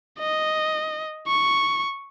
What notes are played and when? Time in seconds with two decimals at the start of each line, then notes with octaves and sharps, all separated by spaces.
0.20 D#5
1.28 C#6